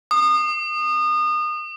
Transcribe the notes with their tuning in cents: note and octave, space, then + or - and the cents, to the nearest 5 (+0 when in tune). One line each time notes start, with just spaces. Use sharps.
D#6 -30